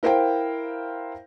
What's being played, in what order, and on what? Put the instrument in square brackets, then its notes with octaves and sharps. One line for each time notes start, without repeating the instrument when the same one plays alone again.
[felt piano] E4 A#4 C5 F5 G5